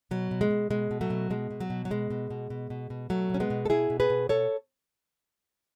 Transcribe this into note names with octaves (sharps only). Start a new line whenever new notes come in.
B2 F#3
B2
G#3
B2
B2 G#3
B2
F#3 A3
B2
B2 G#3
B2
F#3
B2
F#3
B2 G#3
B2
B2
B2
B2
B2
B2 F#3 A3
B2 C#4
G#3 B3
B2
A4
B2 E4 G#4
B2
G#4 B4
B2
B2 A4 C#5